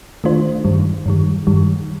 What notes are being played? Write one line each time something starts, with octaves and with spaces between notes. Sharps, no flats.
D#3 A3 D4 F4 C5
G2 D#3 G3
G2 D#3 G3
G2 D#3 G3